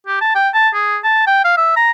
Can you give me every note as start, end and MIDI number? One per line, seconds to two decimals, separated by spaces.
0.07 0.21 67
0.21 0.31 81
0.35 0.49 79
0.54 0.69 81
0.74 0.98 68
1.04 1.26 81
1.27 1.40 79
1.45 1.57 77
1.57 1.74 76
1.77 1.91 82